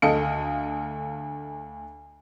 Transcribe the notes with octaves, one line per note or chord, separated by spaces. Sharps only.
D2 A4 D#5 F5 C#7